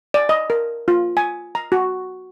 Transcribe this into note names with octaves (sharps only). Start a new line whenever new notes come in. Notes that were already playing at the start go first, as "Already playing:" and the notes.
D5
D#5
A#4
F4
G#5
A#5
F#4